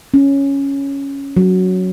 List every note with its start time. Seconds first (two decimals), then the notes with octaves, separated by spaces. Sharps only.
0.14 C#4
1.37 F#3